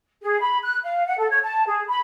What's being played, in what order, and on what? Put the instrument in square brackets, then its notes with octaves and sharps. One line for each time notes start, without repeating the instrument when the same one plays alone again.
[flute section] G#4
B5
F#6
F5
F#5
A4
C#5
A5
G#4
B5